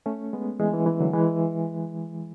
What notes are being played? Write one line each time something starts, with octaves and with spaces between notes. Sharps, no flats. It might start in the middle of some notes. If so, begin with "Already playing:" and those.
A3 C#4
G#3 B3
E3 G#3
E3
E3
D3 F#3
E3 G#3